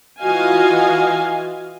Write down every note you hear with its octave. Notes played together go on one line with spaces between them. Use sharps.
E3 F4 F#4 D#5 F5 G#5